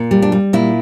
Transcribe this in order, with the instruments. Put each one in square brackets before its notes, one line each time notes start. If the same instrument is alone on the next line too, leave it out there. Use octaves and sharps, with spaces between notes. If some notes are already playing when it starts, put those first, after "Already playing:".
Already playing: [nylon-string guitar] A#2
G3
D4
G3
A#2 E4